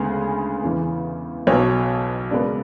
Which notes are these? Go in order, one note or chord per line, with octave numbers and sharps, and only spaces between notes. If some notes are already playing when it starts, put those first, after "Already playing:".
Already playing: D2 C#3 G#3 B3 G#4
E2 C#3 E3
B1 B2 F#3 C#5
F#2 C#3 G#3 B3 D5